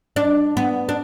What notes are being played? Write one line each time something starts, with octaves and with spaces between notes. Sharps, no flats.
D4
B3
D4